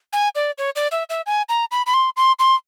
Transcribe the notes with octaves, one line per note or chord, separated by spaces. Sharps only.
G#5
D5
C#5
D5
E5
E5
G#5
A#5
B5
B5
C6
C6
C6